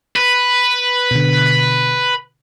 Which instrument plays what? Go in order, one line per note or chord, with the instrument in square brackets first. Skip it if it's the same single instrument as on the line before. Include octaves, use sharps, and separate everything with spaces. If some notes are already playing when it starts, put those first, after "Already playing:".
[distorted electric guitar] B4
[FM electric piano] B2 D3